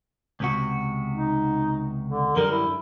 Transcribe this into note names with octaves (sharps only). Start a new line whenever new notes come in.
C#2 C3 F#4
D#4
D3
F#2 D3 G3 A#4
E4